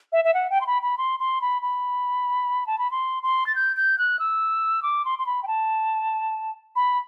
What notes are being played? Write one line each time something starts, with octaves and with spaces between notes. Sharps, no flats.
E5
E5
F#5
G5
C6
B5
B5
C6
C6
B5
B5
A5
B5
C6
C6
A6
G6
G6
F#6
E6
D6
C6
C6
B5
G5
A5
B5